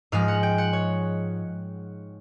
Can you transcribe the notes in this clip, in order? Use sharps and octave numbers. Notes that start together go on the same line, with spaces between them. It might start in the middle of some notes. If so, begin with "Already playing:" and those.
G#2 F3 G#3 F5
F#5
G5
F#5
C#5